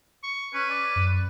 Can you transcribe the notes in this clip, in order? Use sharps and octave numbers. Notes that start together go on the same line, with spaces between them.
C#6
C#4 B4
D5
F#2